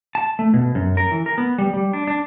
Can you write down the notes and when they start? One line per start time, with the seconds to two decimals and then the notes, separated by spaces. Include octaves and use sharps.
0.15 A5
0.39 A3
0.54 B2
0.75 F#2
0.97 A#4
1.11 E3
1.26 A#4
1.38 B3
1.58 G3
1.74 G3
1.93 D4
2.07 D4